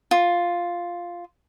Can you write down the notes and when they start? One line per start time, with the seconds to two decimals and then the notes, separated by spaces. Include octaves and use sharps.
0.11 F4